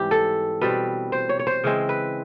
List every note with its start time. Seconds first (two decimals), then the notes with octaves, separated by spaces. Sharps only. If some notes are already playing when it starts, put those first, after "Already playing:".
Already playing: G#2 E3 G3 C4 G4
0.11 A4
0.61 B2 G3 C4 B4
1.12 C5
1.29 C#5
1.39 C#5
1.47 C5
1.64 C#3 E3 G#3 C4
1.89 B4